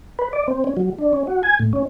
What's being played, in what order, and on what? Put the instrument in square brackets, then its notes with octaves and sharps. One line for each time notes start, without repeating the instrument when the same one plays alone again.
[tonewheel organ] B4
D5
C4
C#4
F#3
D4
C#4
F#4
G#5
A2
C#4